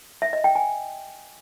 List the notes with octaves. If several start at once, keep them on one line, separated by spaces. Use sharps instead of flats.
E5
D#5
G5
G#5